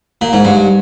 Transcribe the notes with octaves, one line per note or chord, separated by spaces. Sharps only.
A#2
G#2
G2